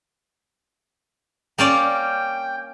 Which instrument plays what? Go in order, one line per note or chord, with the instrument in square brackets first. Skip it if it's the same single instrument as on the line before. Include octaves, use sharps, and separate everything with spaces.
[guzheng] A#3 C#4 D5 [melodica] G5